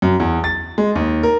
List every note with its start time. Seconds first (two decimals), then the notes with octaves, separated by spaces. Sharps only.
0.02 F#2
0.20 E2
0.44 A6
0.78 G#3
0.95 D#2
1.23 A#4